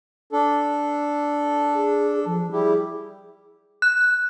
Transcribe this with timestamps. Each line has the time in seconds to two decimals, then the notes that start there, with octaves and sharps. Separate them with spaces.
0.33 D4 A4
1.74 G#4
2.26 F3
2.52 G3 E4 G4 G#4
3.82 F#6